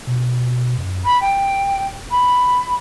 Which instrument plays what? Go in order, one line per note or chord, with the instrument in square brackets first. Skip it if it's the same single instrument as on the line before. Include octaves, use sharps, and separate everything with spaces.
[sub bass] B2
F#2
[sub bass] D#1 [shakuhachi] B5
[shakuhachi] G5
B5